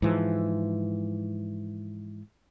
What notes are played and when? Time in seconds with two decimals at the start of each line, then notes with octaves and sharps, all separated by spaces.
0.02 G#2 E3 F3